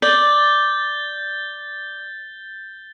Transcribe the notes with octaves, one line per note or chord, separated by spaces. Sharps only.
D5 G6 A6 G7